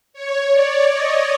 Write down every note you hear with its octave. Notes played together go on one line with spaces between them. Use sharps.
C#5
D5
D#5